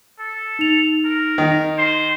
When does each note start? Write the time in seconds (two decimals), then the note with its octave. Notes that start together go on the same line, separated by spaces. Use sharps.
0.20 A4
0.59 D#4 F7
1.05 A#4
1.38 D#3
1.78 C5